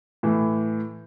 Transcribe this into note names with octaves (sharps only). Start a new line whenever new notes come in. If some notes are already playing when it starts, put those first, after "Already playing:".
A2 E3